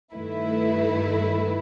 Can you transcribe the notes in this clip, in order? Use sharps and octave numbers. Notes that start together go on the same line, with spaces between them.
G2 D#3 A3 E4 B4